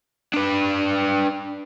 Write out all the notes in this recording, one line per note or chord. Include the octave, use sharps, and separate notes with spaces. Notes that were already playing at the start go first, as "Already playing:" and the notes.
D4 B4